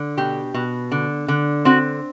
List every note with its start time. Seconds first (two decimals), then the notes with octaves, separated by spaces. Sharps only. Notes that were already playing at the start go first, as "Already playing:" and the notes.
Already playing: D3
0.17 B2 G4
0.54 B2
0.92 D3
1.28 D3
1.65 C4 F#4